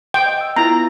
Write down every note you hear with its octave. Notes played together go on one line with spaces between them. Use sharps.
G5
D#5
E6
B3 E4 F4 A#5
E4